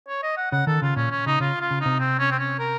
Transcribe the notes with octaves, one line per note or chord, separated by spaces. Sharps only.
C#5
D#5
F#5
C#3 F#5
D#3 A4
C#3 F4
A#2 C#4
C#4
C#3 D#4
C#3 F4
F4
C#3
C3 D#4
C4
C#4
C4
C#4
A#4